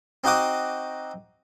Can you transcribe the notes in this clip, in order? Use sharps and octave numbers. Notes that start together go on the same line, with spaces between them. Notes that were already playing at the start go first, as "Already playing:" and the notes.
C4 D#4 F#4 F#5 D6 D#6